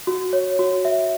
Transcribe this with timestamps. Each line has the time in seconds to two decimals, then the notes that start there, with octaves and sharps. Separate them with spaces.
0.07 F#4
0.33 C#5
0.59 F#4
0.85 E5